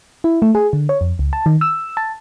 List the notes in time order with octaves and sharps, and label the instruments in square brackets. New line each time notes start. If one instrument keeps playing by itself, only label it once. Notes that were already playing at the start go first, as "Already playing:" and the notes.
[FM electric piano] E4
A3
G#4
D3
C#5
F2
C#2
A5
D#3
E6
A5